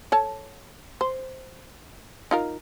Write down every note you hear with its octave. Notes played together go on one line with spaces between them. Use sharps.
A4 C#5 A5
C5
D#4 F4 A#4